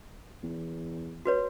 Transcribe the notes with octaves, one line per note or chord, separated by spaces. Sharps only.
E2
F#4 B4 C#5